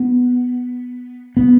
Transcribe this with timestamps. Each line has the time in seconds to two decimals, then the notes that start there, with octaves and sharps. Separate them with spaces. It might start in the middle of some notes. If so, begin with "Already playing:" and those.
Already playing: B3
1.37 B3